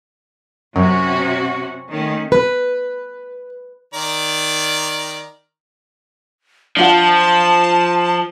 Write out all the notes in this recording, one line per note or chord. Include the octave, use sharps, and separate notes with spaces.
F#2 C3 C#4 F#4
D#3 A3 C#4
B4
D#3 D5 A#5
F3 D4 F4 F#5 A5